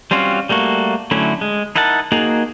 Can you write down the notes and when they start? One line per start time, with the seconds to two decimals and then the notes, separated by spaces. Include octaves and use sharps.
0.11 G3 C4 C#4 F4 F#4
0.49 G3 A3 A#3 F#4
1.11 D3 F#3 A3 C#4 E4
1.41 G#3
1.76 D#4 E4 A#4 F#5 A5
2.12 A#3 D#4 F#4 G#4